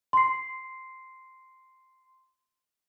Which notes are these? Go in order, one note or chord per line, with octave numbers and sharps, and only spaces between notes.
C6 C7